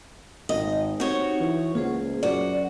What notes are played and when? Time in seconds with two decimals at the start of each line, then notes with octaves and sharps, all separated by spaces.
0.49 G#1 D#5
1.00 C4 D#4 F#4 G4 C#5
1.40 E3
1.75 C#2 A#3 F4 G#4 C5
2.23 F#2 F#4 D5